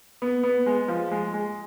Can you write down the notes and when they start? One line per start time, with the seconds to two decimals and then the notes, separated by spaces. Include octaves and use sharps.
0.22 B3
0.44 B3
0.66 G#3
0.88 F3
1.11 G#3
1.34 G#3